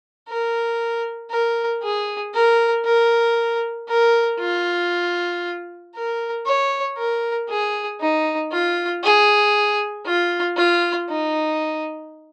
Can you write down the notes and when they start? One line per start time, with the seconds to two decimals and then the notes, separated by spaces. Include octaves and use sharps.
0.29 A#4
1.31 A#4
1.83 G#4
2.34 A#4
2.85 A#4
3.89 A#4
4.40 F4
5.95 A#4
6.46 C#5
6.97 A#4
7.50 G#4
8.01 D#4
8.52 F4
9.04 G#4
10.06 F4
10.57 F4
11.09 D#4